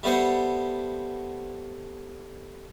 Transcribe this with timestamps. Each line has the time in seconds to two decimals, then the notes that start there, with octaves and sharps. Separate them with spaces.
0.03 G3 A3 B3 C5 F#5